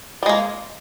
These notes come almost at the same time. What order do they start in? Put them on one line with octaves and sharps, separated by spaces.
G3 G#3 A#3